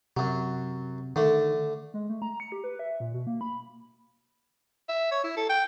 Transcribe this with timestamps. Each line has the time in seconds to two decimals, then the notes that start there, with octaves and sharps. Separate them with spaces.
0.17 F#2 C3 F#3
1.16 D3 D#3 A3
1.94 G#3
2.09 A3
2.22 A#5
2.40 C#7
2.52 G4
2.64 B4
2.79 E5
3.00 A#2
3.14 B2
3.27 A#3
3.41 B5
4.89 E5
5.11 C#5
5.24 E4
5.37 A4
5.49 G5